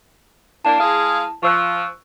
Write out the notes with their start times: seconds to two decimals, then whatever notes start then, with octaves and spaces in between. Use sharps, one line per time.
0.64 A#3 D4 E4 A5 E7
0.80 G#3 G#4 F5
1.43 F3 C#6 E6 F#6